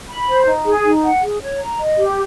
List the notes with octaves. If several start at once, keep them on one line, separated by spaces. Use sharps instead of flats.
B5
C5
D#4
G#4
D#4
F#5
G#4
C#5
A#5
D#5
G4